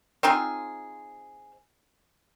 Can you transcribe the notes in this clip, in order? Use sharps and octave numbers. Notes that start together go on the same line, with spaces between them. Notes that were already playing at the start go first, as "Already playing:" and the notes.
C4 D#4 F4 G#4